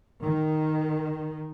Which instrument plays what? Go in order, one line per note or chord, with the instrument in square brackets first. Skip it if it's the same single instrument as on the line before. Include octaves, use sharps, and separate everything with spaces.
[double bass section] D#3